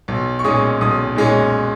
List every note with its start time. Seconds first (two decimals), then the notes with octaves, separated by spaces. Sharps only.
0.08 B1
0.39 C#6
0.44 A#2 G#3 C#4 D#6
0.81 B1 D#6
1.16 A#2 G#3 C#4